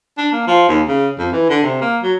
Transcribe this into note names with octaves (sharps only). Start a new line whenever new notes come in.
D4
A#3
F3
D#2
C#3
F2
E3
D3
C3
A#3
F#3